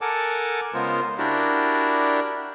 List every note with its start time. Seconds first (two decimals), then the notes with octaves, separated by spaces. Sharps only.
0.01 A4 A#4 F#5 G#5 A5 D6
0.74 C#3 G#3 B3 F4 A#4 C5
1.18 D4 E4 F#4 G4 A#4 D5